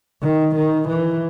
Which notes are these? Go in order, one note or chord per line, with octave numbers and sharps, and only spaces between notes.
D#3
D#3
E3